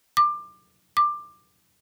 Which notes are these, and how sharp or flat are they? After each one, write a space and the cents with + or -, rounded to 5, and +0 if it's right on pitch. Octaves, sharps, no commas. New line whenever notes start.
D6 +20
D6 +15